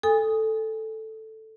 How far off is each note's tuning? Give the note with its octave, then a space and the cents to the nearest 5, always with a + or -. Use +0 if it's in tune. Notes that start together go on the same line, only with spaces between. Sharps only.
A4 +0 G#5 -20 D#6 +0